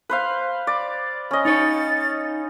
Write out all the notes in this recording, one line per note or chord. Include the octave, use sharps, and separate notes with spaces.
B4 C5 F5
D5
C#4 D#5
D#4 C#5 A6